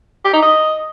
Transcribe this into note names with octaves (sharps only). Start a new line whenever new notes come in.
G4
D#4
D#5